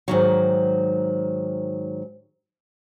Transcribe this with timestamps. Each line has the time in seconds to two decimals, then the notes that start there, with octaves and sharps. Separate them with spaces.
0.08 G#2 D#3 F#3